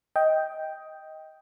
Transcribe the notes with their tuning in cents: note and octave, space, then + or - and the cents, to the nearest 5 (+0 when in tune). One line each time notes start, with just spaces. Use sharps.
D#5 +15 G5 +0